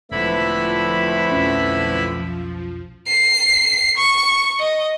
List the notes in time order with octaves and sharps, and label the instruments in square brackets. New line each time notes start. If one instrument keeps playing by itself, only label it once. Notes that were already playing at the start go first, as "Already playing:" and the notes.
[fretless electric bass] E1 [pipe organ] D3 E4 B5 [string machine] F3 [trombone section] A3 C4 B4
[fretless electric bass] B1 F2 C#4
[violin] C7
C#6
D#5